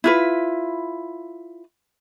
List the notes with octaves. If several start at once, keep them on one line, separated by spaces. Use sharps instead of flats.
E4 F4 B4